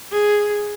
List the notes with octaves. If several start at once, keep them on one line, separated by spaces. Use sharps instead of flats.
G#4